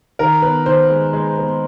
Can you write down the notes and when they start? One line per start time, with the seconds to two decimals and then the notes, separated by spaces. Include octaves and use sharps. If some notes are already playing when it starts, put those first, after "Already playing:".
0.19 D#3 A#4
0.42 B3 B4
0.66 D#3 C5
0.89 G#3
1.13 G#3
1.37 B3